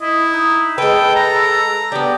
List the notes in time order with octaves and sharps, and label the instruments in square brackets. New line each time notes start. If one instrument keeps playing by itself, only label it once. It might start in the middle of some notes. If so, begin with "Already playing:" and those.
[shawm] E4 [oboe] D#5
[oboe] D#4
[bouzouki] G#3 B4 [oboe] A4 [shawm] G5
[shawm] A#5
[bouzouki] B3 D4 [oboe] G4